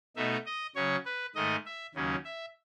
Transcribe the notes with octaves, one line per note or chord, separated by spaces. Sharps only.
B2 A3 D#4 E5
D#5
C#3 F#3 C#4 C#5
B4
G#2 D#3 A3 D#5
E5
D#2 C#3 F#3 C#4
E5